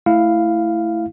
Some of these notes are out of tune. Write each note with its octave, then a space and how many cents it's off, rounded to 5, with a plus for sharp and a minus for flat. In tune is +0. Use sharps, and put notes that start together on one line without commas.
A3 +0 E4 +5 F5 +0